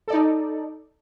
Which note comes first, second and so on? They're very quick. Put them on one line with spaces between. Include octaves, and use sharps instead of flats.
A4 D5 D#4